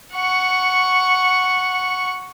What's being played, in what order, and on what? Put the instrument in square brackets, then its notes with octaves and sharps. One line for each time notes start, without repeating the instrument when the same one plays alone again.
[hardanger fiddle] F#5 C#6